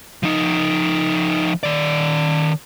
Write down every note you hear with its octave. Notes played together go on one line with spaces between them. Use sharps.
F3 D#4
D#3 D5